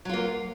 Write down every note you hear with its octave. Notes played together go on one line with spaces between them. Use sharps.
F#3 A#3 F4